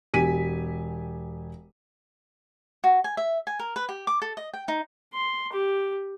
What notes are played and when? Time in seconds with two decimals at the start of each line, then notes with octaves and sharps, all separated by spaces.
0.14 E1 G4 G#5 B6 D#7
2.84 F#4
3.04 G#5
3.17 E5
3.47 G#5
3.59 A#4
3.76 B4
3.89 G4
4.07 D6
4.22 A4
4.37 D#5
4.54 G5
4.68 D#4
5.13 C6
5.53 G4